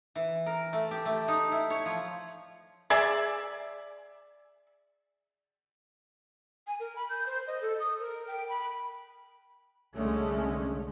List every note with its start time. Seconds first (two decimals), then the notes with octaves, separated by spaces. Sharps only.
0.15 E3
0.46 A#4
0.73 A3
0.91 G4
1.05 A3
1.28 D#4
1.52 E4
1.70 C#5
1.85 F3
2.90 G#4 D5 E5
6.67 G#5
6.80 A#4
6.96 B5
7.10 G6
7.27 C5
7.47 D#5
7.61 A4
7.80 D#6
8.00 A#4
8.28 G5
8.49 B5
9.96 C2 D3 G#3 A3 C#4